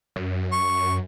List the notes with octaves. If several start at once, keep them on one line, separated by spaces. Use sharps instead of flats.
F#2
C#6